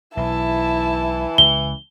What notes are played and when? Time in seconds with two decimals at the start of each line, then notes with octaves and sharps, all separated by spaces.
0.17 B1 E3 E4 A5
1.38 C#2 G7